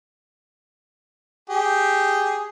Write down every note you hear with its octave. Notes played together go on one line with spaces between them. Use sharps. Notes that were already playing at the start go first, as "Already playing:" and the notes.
G4 G#4